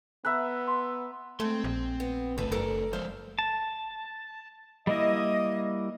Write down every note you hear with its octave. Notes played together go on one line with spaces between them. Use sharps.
B3 E5 A#5 B5 F#6
C6
G#3 A3 C4 C6
A#1
B3
G1 C#3 A3 A4 B4
F#1 A4 A#4 D5
F3 G#3 C5 E5 F5
A5
G3 A#3 E4 D#5